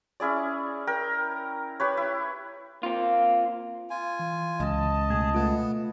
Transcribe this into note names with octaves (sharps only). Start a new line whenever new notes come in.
C#4 E4 G#4 D5
A#4 G5
G4 B4 C#5
E4
A#3 C4 F4
F4 G#5
E3
C#2 D#5 A5
B2 A3 G#4 G#6
A3 B3 F4